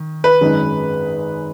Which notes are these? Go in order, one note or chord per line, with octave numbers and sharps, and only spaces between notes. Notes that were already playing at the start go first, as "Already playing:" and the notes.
Already playing: D#3
B4
G#1 F#2 D#3 G#3 D#4